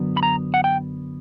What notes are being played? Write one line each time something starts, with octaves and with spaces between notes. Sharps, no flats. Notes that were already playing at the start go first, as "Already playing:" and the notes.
Already playing: F#2 D3 F#3 B3
B5
A#5
F#5
G5